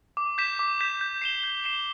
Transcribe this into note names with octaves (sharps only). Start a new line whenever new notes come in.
D6
G6 B6 E7
D6
G6 B6 E7
G6
C7 E7 G7
G6
C7 E7 G7